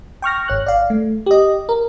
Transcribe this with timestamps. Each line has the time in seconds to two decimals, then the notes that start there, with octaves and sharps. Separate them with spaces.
0.22 G5 C#6 F6 A#6
0.48 G#1 C#5 F#6
0.66 D5 F5
0.90 A3
1.26 G4 D#5
1.69 A#4